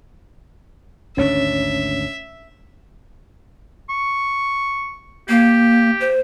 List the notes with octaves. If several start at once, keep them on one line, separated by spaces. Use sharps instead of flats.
G#1 D2 C#4 D4 C#5 E5
C#6
A#3 G4
C5